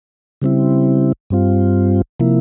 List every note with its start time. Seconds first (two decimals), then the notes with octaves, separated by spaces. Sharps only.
0.42 C#3 G3 C4 E4
1.30 G2 G3 C4 F4
2.20 C3 F3 A#3 E4